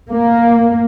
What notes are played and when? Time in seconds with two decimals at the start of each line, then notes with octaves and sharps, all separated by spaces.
0.12 A#3